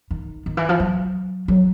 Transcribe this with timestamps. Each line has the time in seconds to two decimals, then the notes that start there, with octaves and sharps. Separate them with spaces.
0.11 D#3
0.46 D#3
0.57 E3
0.69 F3
0.80 F#3
1.48 F#3